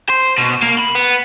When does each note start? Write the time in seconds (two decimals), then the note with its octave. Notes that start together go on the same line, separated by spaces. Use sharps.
0.09 C5
0.38 B2
0.63 A#3
0.79 B5
0.95 B3